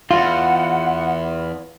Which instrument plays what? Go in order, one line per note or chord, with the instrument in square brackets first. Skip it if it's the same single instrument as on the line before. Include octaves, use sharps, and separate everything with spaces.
[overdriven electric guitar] E2 [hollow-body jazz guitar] F4 [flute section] F#5